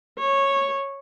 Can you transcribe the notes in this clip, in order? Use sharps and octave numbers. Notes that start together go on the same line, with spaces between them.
C#5